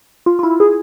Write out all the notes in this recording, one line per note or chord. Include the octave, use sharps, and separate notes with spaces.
F4
F4
E4
G#4